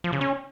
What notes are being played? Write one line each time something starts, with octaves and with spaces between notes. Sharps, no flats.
F3
C#3
C#4